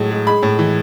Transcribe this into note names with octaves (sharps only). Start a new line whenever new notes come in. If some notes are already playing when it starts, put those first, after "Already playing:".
Already playing: A2 F#3 G#3
G#3
G#3 B5
A2
E3